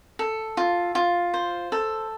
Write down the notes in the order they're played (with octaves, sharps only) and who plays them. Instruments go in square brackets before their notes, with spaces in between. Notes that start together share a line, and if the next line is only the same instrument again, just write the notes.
[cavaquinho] A4
F4
F4
C5
A4